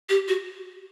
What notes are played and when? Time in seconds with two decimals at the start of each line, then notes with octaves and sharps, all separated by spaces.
0.09 G4
0.28 F#4